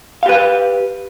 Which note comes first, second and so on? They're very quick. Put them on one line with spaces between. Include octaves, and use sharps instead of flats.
F5 G4 B4